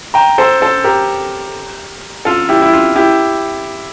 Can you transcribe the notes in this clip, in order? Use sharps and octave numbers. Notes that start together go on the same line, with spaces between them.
G5 A#5
A4 C5
A4 C5
G4 A#4
F4 A4
E4 G4
E4
F4
E4 G4